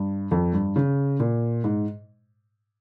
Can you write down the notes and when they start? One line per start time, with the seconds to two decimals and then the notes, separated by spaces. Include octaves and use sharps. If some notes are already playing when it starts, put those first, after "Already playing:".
Already playing: G2
0.31 F2
0.53 G2
0.76 C#3
1.20 A#2
1.64 G#2